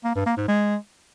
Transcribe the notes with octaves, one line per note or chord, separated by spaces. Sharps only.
A#3
G2
A#3
G#2
G#3